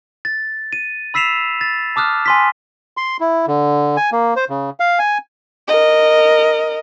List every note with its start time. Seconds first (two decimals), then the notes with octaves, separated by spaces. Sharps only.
0.25 A6
0.73 D#7
1.14 B5 E6 B6 C7 E7 F7
1.61 A6
1.96 A5 D6 D#6 F6 F#6
2.26 G#5 C6 B6
2.97 C6
3.20 E4
3.47 D3
3.97 G#5
4.12 A#3
4.36 C5
4.50 C#3
4.80 F5
4.99 G#5
5.68 A#4 D#5